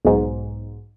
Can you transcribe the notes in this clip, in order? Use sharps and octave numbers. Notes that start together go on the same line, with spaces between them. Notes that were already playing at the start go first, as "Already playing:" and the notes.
B1 G#2